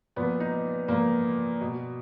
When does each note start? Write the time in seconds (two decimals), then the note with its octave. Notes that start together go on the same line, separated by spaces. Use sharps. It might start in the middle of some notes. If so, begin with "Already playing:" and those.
0.16 A#2 F3 B3
0.40 D#4
0.88 A#2 F3 A#3
1.61 B2